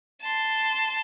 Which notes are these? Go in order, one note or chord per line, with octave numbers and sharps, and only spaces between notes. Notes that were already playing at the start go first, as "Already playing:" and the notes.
A5 C6